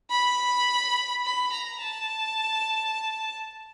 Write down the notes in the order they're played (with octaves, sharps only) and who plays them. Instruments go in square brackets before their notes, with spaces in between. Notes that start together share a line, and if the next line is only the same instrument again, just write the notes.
[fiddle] B5
B5
A#5
A5